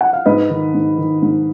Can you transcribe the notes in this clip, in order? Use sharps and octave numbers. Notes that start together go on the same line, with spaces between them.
F#5
F5
G#2 B4 D#5
D#3
G#2
D#3
G#2